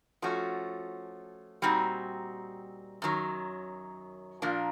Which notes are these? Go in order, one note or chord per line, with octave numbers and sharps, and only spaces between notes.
F3 A3 C#4 F#4
A#2 G3 C4 D#4 F#4
F#2 D#3 F#3
A#2 F3 A#3 D4